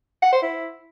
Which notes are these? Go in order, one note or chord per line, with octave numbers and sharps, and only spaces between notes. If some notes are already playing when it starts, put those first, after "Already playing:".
F#5
C5
E4